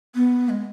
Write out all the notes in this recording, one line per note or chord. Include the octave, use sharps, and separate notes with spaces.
B3
G#3